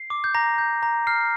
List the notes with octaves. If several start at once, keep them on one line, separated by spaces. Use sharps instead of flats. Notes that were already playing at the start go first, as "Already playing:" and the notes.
Already playing: C7
D6
G6
A#5 A#6
G6
A#5
F6 C7